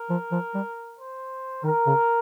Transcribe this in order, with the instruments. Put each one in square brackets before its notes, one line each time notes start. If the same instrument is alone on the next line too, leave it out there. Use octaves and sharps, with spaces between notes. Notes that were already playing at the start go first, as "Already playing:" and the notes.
Already playing: [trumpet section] A#4
[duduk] F3
F3
G3
[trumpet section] C5
[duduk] D#3 [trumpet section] A#4
[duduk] C#3